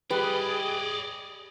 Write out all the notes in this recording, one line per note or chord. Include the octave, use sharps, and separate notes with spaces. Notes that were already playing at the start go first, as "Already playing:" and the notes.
G3 G#4 B4 D5 D#5 B5